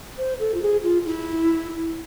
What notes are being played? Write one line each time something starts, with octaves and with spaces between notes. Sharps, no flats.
C5
A4
F4
G#4
F4
E4